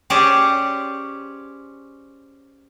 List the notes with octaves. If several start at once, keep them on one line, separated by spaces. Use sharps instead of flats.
C#4 G4 G#4 C5 D5